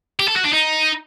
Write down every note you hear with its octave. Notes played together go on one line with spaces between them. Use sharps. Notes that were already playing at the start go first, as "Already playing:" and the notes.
G4
A4
F#4
D4
D#4